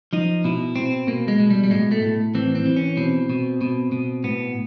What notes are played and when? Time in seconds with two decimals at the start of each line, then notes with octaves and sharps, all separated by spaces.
0.13 F3 D#4
0.44 B2 E4
0.76 B2 C4
1.07 B2 A#3
1.28 G#3
1.39 B2
1.50 G3
1.64 G3
1.70 A2 G#3
1.91 A3
2.02 A2
2.35 E3 C4
2.55 C4
2.66 E3
2.76 C#4
2.97 B2 C4
3.30 B2
3.61 B2
3.92 B2
4.24 A2 B3